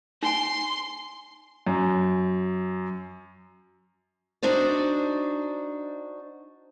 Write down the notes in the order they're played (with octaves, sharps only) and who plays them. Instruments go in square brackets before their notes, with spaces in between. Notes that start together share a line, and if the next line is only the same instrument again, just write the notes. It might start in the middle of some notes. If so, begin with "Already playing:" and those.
[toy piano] D#4 G#5 [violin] C6
[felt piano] F#2
[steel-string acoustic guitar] D4 D#4 F#4 C5 D5